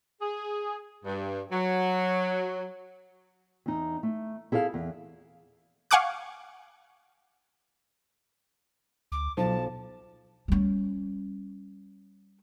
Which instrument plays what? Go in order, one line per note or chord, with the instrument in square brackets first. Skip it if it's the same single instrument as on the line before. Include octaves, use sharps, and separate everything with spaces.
[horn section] G#4
G2
F#3
[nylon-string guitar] E2 D#4
A3
E4 G#4 A4 D5 F5
E2
[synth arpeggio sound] F5 F#5 G#5 C#6 D6 F#6
[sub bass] D2 [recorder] D6
[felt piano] B1 [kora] F3 [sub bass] F#3 [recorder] A5
[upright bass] G3 C#4